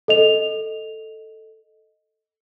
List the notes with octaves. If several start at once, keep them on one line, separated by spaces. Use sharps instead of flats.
A4 D#5 F7